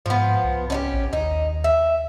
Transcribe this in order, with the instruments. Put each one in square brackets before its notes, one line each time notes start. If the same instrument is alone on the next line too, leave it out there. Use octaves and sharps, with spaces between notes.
[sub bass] G#2 [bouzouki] F3 B3
[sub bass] C2
[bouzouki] C#4 D#4 G4
[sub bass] A1
[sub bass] D#2 [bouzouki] D#4
[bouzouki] E5